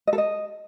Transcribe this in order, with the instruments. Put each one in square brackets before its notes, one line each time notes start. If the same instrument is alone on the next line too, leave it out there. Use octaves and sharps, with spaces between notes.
[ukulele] D#5
A4
D#5